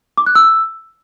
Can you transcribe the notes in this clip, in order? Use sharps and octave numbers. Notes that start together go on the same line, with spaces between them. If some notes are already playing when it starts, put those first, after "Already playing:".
D6
F#6
E6